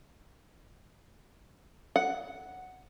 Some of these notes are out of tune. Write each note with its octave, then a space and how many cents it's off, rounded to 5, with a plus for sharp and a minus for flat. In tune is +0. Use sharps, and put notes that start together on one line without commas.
F#5 +0